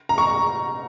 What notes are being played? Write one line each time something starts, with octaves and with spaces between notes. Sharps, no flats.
A#5
C#6